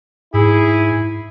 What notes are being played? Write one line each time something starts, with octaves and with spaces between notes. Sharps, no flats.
G#2 E4 G#4